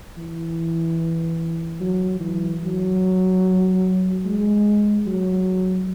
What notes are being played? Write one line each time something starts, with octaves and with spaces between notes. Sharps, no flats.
E3
F#3
E3
F#3
G#3
F#3